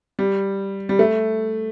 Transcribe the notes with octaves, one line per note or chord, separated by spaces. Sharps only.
G3
G3
A3